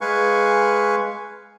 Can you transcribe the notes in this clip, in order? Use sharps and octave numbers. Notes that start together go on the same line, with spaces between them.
G#3 B4 F5 G#5 C#6